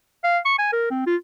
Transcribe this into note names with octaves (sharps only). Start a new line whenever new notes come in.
F5
C#6
G#5
A#4
C4
F4